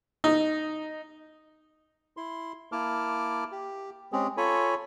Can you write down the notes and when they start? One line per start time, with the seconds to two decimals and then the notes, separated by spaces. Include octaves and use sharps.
0.24 D#4
2.17 E4 C6
2.72 A#3 E4 A5 D6 F6
3.52 G4
4.12 G#3 C4 C#4 G4 G#4
4.37 F4 A4 C#5 G#5 B5